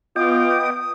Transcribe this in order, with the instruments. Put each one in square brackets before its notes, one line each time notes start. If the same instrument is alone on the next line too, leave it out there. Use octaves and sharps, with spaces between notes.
[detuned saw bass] B3 [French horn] F4 [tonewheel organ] D#5 G5 D6 [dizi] D#6